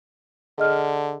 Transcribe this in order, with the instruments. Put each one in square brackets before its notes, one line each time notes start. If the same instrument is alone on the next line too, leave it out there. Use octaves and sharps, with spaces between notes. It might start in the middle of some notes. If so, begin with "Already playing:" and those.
[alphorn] D3 [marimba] G#4 D#5 F6